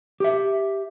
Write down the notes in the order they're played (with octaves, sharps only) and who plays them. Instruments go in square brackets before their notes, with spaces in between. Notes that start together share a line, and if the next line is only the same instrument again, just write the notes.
[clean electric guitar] G4 E5